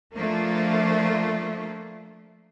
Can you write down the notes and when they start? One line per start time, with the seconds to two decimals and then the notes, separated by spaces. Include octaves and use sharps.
0.14 F3 A3 A#3 D4 F4